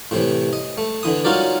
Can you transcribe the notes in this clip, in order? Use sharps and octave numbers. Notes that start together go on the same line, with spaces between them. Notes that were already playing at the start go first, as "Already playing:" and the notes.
A2 C3 E3
D#5
A3
D3 E3 D#6
C#4 D#4 F4 F#4 A#4 D5